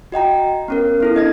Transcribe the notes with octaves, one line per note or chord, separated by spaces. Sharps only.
F#4 D#5 G5 A#5
B3 C#4 A#4
B3 E4 A4
D4 D#5 G#6 A#6